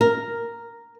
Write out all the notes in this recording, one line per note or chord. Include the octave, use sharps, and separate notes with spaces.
A#4